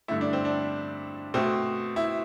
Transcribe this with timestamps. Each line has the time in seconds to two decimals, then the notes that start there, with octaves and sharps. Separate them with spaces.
0.08 G2 D3 A3 E4
0.21 D4
0.33 C4
0.45 D4
1.34 B2 A3 C4
1.96 E4